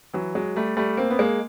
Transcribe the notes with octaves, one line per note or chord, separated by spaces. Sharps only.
E3 F#3
F#3 G#3
G3 A3
G3 A3
A#3 C4
B3
G#3 A#3